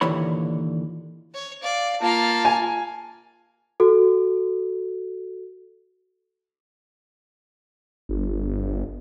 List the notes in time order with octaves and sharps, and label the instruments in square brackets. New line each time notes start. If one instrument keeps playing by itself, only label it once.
[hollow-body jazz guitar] D#2 A#2 D3 E3 C#5 B5
[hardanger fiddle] C#5
[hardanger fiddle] D5 [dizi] F5
[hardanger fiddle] A#3 F5 [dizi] F4 [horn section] A5
[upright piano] G#5
[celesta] F#4 A4
[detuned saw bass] G1